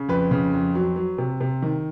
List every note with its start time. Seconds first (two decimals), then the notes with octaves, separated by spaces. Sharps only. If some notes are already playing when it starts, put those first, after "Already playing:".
Already playing: C#3
0.09 F2 B4
0.31 C#3
0.53 F2
0.75 F#3
0.96 F#3
1.18 C3
1.41 C3
1.62 D#3